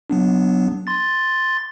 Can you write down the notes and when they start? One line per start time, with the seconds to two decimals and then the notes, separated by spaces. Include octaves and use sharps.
0.10 F#3 B3 D4
0.87 C6 A6